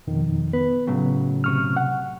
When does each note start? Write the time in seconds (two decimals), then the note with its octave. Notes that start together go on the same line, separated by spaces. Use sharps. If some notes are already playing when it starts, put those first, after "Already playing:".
0.07 F2 B2 D#3
0.53 B3 B4
0.87 A2 C#3 F#3
1.44 C3 C#6 F6
1.77 F#5